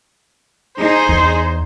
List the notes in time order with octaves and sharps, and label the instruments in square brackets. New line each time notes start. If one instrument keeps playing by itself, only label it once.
[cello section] D#4 G#4 [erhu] C5
[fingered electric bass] E2